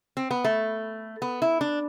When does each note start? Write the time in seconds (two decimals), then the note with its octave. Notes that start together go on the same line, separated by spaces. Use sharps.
0.17 C4
0.31 B3
0.44 A3
1.22 B3
1.42 E4
1.61 D4